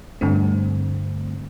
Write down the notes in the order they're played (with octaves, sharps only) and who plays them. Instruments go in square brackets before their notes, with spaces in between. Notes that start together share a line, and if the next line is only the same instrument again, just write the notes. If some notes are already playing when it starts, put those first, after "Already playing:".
[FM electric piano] G2 D3 A3 C4